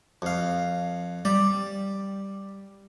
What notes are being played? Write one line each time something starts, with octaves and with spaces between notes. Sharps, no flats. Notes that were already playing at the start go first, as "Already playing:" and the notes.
F2 F5
G3 D5